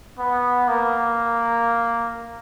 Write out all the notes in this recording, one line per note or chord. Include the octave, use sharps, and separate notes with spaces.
B3
A#3